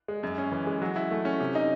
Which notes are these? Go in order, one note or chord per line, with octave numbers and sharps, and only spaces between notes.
G#3
F#2
C#4
E3
G#3
F#3
E4
A3
C#4
C3
D#4